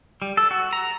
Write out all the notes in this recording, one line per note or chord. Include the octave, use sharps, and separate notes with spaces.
G3
A4
F#4
A#5